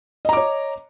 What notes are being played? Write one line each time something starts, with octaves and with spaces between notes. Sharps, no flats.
C#5 D#5 A#5 D6